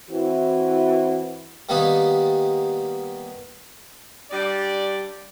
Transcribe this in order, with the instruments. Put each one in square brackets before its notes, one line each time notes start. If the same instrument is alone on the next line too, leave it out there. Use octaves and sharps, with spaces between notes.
[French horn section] E3 C4 E4 F#4
[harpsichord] D#3 G3 A#3 B3 D#4
[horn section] G3 D4 D5